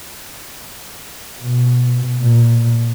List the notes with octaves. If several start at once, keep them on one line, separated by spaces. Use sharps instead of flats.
B2
A#2